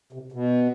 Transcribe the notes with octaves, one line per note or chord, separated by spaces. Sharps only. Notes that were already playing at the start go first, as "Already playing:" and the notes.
C3
B2